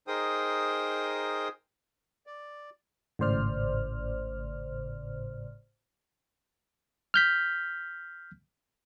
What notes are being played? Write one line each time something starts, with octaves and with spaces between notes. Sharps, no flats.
D#4 G#4 A#4 C5 G5 D#6
D5
G#1 A2 C#3 C5 D5 F6
F6 G6 B6